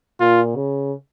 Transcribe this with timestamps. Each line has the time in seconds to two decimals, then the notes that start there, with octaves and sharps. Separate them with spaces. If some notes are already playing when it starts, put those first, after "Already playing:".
0.20 A#2 F4
0.56 C#3